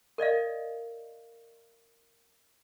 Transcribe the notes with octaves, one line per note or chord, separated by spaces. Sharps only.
A#4 D5 D#5 F5